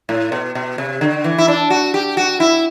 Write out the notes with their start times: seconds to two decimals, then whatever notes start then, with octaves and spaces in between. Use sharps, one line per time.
0.09 A2
0.32 B2
0.55 B2
0.78 C3
1.01 D3
1.24 E3
1.38 E4
1.48 D4
1.70 F#4
1.94 G4
2.17 F#4
2.40 E4